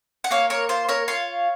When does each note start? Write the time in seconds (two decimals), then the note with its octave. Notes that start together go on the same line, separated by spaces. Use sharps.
0.24 F#5
0.31 A#3 C#5 F5
0.50 A#4 C#5
0.69 F4 C5
0.89 A#4 C#5
1.08 F4 C#5 F5